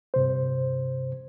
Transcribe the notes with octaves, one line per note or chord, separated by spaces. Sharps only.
G2 C3 C5